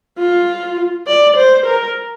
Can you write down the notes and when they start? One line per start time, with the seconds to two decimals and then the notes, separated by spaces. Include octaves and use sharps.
0.18 F4
1.07 D5
1.37 C5
1.66 A#4